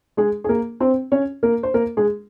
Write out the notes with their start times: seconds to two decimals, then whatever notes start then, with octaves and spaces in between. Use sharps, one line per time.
0.17 G#3 G#4
0.44 G#4
0.49 A#3 A#4
0.80 C4 C5
1.12 C#4 C#5
1.43 A#3 A#4
1.63 C5
1.74 A#3 A#4
1.97 G#3 G#4